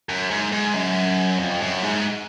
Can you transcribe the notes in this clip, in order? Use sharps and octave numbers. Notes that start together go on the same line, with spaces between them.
F#2
G#2
G#2
F#2
F2
F#2
G#2